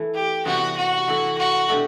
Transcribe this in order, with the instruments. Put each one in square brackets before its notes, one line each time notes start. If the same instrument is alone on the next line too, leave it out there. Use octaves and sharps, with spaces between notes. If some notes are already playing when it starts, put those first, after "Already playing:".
Already playing: [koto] E3 A3 E4
[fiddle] G4
[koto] C3 E3 G3 B3 [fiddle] F#4
[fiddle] F#4
[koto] E3 A3 E4
[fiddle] F#4
[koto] B2 A3 D4 G4